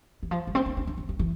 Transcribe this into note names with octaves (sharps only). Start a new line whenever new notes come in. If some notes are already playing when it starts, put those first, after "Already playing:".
E3
F3
G3
C4
D4
D4
D4
E3
F3
E3